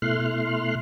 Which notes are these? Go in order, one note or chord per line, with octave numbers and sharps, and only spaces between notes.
B2 A3 E4 C6 F6 F#6